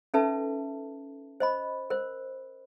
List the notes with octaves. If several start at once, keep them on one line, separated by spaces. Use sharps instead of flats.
C#4 D#4 A4 B4 E5 A5
C5 D#5 B5
A#4 C5